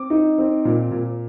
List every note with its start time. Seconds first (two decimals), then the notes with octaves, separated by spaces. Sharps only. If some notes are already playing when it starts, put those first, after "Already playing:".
Already playing: C4 D6
0.10 D#4
0.38 C4
0.65 A#2
0.91 A#2